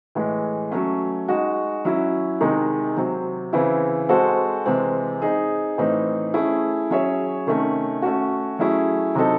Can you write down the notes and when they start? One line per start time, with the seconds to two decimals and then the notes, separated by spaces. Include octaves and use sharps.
0.15 A2 E3 G#3
0.72 F#3 A3 C#4
1.28 G#3 D#4 F#4
1.85 F#3 C#4 E4
2.41 C3 D#3 G#3 D#4
2.97 C3 F#3 C4
3.53 C#3 E3 C4 E4
4.09 G#3 C4 F#4 A4 C5
4.66 C3 E3 G#3 C4
5.22 C4 D#4 G#4
5.78 A2 E3 C4 D#4
6.34 A3 C#4 E4 G#4
6.90 F#3 C#4 G#4 C#5 E5
7.47 C3 D#3 A3 C#4
8.02 A3 C#4 F#4
8.59 F#3 A3 C#4 E4 G#4
9.15 C3 F#3 C4 D#4 A4